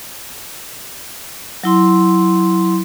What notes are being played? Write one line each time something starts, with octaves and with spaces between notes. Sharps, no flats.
F#3 E4 C6